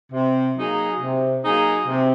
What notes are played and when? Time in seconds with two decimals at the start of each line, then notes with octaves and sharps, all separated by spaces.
0.12 C3
0.56 F#3 A#3 D#4 G#4
1.00 C3
1.44 F#3 A#3 D#4 G#4
1.88 C3